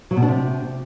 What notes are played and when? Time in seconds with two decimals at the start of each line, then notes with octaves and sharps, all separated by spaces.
0.11 F#3
0.17 B2
0.22 D4
0.28 C3